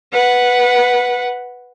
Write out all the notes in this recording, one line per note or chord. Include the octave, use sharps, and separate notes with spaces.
B4 F#5